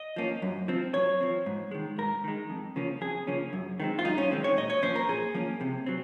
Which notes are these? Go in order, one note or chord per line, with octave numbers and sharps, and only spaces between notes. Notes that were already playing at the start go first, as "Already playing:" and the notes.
Already playing: D#5
F3 A#3 C#4
F#2
F3 C4
F#2 C#5
F3 C4
G#2
D#3 G#3
G#2 A#4
D#3 G#3
F2
C#3 F3 A#3 C#4
F2 G#4
C#3 F3 A#3 C#4
F#2
D#3 G#3 C4
F4
F#2 D#4
C#4
D#3 G#3 C4
C#5
A#2 D#5
C#5
F3 A#3 C#4 C5
A#4
A#2 G#4
F3 A#3 C#4
C3
F#3 C4